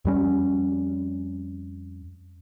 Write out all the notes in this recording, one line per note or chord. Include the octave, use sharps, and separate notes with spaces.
F2 G3 C#4